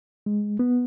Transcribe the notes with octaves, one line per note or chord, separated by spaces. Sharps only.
G#3
B3